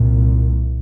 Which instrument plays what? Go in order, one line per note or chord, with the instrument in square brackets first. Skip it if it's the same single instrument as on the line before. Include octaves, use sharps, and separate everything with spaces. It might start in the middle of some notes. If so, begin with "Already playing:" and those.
Already playing: [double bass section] C2 A#2